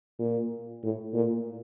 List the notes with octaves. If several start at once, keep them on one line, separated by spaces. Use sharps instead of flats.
A#2
A2
A#2